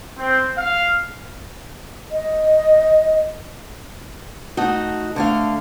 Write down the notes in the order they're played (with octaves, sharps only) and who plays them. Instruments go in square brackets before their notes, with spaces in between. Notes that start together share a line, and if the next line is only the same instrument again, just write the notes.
[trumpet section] C4
F5
[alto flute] D#5
[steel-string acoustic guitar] A3 D#4 F#4
D3 A3 F5